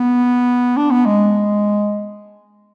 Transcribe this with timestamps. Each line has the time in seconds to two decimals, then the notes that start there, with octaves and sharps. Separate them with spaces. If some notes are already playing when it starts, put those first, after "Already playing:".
Already playing: B3
0.77 D4
0.91 B3
1.06 G#3